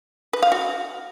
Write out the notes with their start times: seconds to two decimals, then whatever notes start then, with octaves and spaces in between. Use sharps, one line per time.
0.33 B4
0.43 F5
0.52 F#4